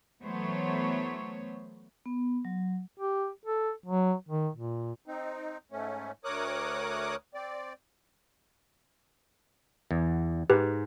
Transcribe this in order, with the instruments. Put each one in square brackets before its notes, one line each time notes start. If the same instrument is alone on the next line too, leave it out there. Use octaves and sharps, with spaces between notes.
[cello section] E3 F#3 A3 B3 C5 C#5
[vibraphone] B3
F#3
[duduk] G4
A4
F#3
D#3
A#2
[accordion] C4 D#4
G#2 A3 C#4
D2 A#4 C#5 D6 D#6 F#6
C4 D5
[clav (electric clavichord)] E2
[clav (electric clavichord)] G#2 [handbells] G4 B4